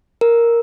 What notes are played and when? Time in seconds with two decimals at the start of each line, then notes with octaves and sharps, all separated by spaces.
0.21 A#4